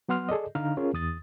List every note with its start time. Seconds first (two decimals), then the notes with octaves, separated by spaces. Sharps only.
0.09 F#3 B3 F#5 C6 F6
0.29 G#4 A4 D5 D#5
0.55 D3 D4 D#4 F5 A#5 F6
0.77 C#4 F4 G#4 A#4
0.94 E2 D#6 A6